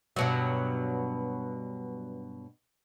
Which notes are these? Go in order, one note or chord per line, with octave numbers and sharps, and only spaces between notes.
G2 B2 F#3